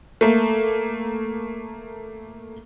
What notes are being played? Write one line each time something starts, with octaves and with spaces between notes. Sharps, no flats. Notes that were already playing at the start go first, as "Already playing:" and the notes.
A3 A#3